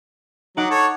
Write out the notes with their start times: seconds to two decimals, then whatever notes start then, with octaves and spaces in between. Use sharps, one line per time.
0.57 F#3 D#4 F#5 D6
0.71 A4 C#5